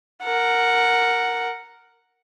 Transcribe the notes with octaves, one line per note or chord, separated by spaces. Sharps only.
A#4 F#5